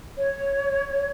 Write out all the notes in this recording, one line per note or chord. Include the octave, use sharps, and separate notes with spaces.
C#5